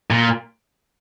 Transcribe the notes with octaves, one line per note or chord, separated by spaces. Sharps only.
A#2